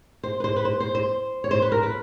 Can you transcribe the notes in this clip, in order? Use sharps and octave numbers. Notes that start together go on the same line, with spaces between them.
C5
B4
C5
B4
C5
C5
C5
C#5
C5
B4
A#4
B4